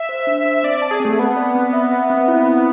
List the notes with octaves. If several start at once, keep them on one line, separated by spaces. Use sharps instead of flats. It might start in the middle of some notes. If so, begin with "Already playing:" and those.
Already playing: E5
C5
D4
C5
C4 D5
D5 A5
G#4
A3 C4
B3 A5
D5
C4
E5
E5
C4
E4
C4